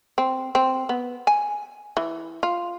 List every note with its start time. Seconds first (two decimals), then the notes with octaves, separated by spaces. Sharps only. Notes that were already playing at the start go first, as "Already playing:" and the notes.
0.18 C4
0.55 C4
0.89 B3
1.27 G#5
1.97 E3
2.43 F4